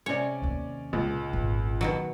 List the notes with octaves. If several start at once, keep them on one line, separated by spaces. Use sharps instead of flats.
C3 G#3 C#4 C#5 D5
D#2 A#3
C#2 A#2
G#1 A#2
B2 D#3 F#3